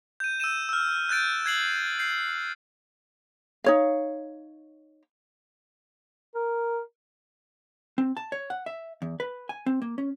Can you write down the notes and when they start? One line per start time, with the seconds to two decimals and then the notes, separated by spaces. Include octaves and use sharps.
0.20 G6 D#7
0.40 E6 G6 D#7 E7
0.69 E6 F6
1.09 F#6 G6 A6 D7
1.44 F#6 G#6 C7 F#7
1.99 G6 C7
3.64 D#4 C#5 F5
6.35 A#4
7.98 C4
8.17 A5
8.32 C#5
8.50 F#5
8.66 E5
9.02 E2
9.20 B4
9.49 G#5
9.66 C4
9.82 A#3
9.98 C#4